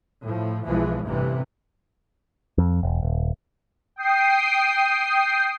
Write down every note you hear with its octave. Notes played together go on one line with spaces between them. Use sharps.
A2 F3
B1 E3 F3 G#3
A1 G2 C3 E3
F2
E1
D#1
G5 D#6 C7